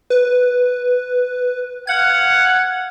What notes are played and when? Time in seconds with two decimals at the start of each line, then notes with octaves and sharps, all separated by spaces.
0.10 B4
1.87 F5 F#5 G#6